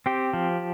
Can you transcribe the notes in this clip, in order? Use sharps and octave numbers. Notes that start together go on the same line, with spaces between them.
C4 G4
F3